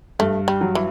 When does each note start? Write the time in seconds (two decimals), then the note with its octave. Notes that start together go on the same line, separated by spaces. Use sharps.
0.19 G2 A3
0.48 G3
0.61 F#3
0.75 E3